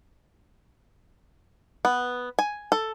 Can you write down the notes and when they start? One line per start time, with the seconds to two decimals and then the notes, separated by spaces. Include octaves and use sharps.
1.85 B3
2.39 G#5
2.72 A4